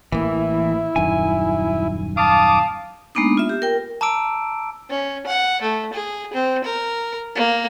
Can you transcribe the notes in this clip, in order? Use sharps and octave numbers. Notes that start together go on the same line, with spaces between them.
A1 E3 A#3 E4
D#1 F#2 D#3 G#5
F5 A5 D6 D#6
G#3 A#3 B3 D4 D#4
F4 E5
G4
A#4 G5
A5 A#5 D6 E6 D7
C#4
F#5
A3
G#4
C4
A#4
A#3